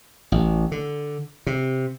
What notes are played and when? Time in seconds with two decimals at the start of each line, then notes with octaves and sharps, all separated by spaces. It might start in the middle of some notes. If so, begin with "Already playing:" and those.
0.32 A1
0.72 D3
1.47 C3